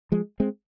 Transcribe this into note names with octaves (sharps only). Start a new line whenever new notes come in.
F3 G#3
G#3 C4